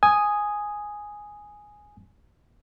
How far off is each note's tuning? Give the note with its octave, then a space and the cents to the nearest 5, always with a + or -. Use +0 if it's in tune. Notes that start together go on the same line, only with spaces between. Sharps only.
G#5 +0 D#6 +0